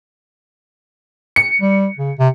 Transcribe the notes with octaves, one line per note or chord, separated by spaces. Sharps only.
C#7
G3
C#3
C3